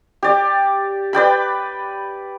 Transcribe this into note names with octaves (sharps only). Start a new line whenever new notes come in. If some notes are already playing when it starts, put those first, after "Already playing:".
G4 D5
B4 D5 G5 B5